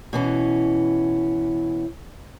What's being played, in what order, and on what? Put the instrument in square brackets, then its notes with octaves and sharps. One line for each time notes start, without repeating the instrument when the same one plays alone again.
[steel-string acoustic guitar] B2 E3 C#4